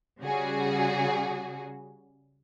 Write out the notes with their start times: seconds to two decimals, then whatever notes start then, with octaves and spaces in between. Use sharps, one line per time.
0.21 C#3 G3 F#4 G#4